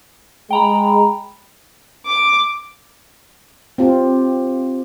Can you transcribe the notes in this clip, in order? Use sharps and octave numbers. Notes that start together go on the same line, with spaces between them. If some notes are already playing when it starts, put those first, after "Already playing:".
G#3 G5 A#5 B5
D6
C4 F4 G4